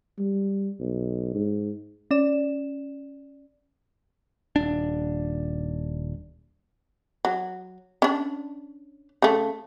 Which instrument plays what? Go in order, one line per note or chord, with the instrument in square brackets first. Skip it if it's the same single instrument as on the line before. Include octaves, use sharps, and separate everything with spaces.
[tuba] G3
B1
G#2
[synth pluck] C#4 D5 E7
[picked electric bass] D#1 D4
[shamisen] F#3
C#4 D4
C#3 A3